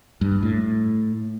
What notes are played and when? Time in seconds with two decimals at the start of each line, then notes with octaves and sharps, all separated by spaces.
0.21 G2
0.43 A2